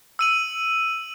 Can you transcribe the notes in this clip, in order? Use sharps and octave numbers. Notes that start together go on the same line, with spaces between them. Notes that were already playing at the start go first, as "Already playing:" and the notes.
E6 D#7 F#7